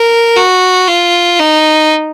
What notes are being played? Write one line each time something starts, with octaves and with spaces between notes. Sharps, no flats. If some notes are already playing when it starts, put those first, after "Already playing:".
Already playing: A#4
F#4
F4
D#4